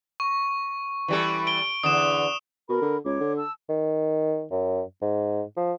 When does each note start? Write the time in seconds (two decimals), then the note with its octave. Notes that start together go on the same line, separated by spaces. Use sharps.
0.20 C#6
1.08 E3 G3 A4
1.47 D7 G7
1.83 E2 D3 D#6 E7
2.69 B2 A#4 B5
2.82 D3
3.05 C#2 C#5 D6
3.20 D3
3.37 A5 E6
3.69 D#3
4.51 F#2
5.02 G#2
5.57 F3